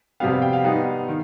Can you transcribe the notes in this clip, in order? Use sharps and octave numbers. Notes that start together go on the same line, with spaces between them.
F2 C3 G3 B3 F5
F5
G5
F5
G#2 G3 B3 D#4
D#3